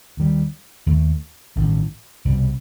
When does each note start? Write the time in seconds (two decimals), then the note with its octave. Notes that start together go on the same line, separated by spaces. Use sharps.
0.17 D#2 D#3 G3
0.86 D#2 D#3 A3
1.56 A1 G2 D#3
2.25 C2 B2 G3